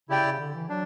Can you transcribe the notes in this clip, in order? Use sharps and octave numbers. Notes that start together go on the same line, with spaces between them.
C#3 E4 G4 D5 G5
C#3
D3
E3
F#3 D4